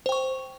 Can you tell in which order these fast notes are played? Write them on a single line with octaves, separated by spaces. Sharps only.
C5 G5 C#6